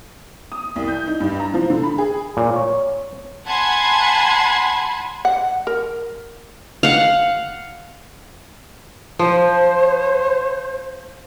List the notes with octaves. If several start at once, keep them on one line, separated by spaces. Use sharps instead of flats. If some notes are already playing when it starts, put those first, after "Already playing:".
D#6
C2
G6
D#4
G2
A#5
F3
D3
B5
G#4
A#2
C#5
F#5 G#5 A5 B5 C6 G#6
F#5
A#4
F5 F#5
F3 C5